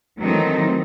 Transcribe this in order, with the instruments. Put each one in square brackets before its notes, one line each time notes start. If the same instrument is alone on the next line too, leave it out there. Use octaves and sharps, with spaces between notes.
[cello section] D#3 E3 F#3 A3 C4 D#4